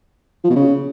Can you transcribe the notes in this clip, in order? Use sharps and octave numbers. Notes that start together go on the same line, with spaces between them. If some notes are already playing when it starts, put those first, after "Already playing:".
F3
B2
C#3